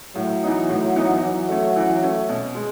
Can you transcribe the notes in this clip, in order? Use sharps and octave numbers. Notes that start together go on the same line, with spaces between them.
A2 F#3
E3 B3 D#4
A2
E3 B3 D#4
E3 F#3
A3 C#4
E3
A3 C#4
B2
G#3